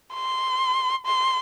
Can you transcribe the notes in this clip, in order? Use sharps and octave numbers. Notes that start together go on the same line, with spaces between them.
C6
C6